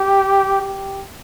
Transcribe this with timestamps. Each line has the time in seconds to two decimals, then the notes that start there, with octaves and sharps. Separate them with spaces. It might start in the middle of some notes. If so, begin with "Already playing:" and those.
Already playing: G4
0.62 G4